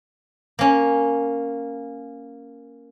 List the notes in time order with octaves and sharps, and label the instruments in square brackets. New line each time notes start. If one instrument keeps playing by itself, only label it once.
[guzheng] A#3 C#4